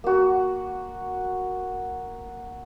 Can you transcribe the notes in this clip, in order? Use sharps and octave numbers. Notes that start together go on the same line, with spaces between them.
A#3 F#4